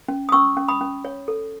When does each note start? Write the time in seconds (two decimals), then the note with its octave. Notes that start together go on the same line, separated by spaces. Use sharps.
0.08 C#4
0.29 D#6
0.32 C#4 C#6 E6
0.57 C#4
0.68 B5 D#6
0.81 C#4
1.05 C#5
1.28 A4